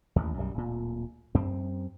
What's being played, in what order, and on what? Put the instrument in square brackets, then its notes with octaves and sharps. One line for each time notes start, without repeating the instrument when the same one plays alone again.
[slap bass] A1 D#2
B1 F#2 F3 G3
D1 A#2
F#2 C4